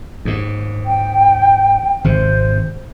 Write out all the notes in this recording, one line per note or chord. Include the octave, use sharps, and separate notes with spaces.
D#2 G#2
G5
G#1 C3 C5